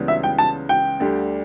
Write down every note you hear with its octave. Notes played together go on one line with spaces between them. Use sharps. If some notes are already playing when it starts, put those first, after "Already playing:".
Already playing: C#2 C#3 E3 G3 B3
E5
G5
A5
G5
D2 D3 G3 D4 G4